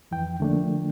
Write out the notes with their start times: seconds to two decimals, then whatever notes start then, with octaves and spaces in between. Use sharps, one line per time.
0.11 F2 E3 G5
0.40 D3 F3 A3 A#3 D4